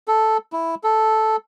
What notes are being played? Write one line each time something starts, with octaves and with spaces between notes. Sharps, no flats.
A4
E4
A4